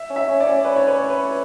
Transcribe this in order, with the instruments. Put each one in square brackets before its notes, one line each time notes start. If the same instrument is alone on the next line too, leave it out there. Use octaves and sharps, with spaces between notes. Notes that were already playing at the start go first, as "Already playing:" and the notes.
Already playing: [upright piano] E5
[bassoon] C#4
[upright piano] E5
[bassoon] C#4
[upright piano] D5
[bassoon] C#4
[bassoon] C#4 [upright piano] B4
[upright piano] C#5
B4
C#5
B4